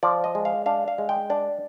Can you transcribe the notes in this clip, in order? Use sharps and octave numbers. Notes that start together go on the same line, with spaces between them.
F3 D5
D#5
G#3
F5
D4 F5
F5
G#3
G5
D4 D5